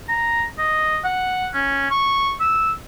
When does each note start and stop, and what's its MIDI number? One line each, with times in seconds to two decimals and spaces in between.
0.09 0.43 82
0.58 0.98 75
1.04 1.49 78
1.54 1.91 61
1.91 2.34 85
2.40 2.72 88